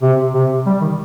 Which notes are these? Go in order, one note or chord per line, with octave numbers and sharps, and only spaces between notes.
C3
C3
G3
D#3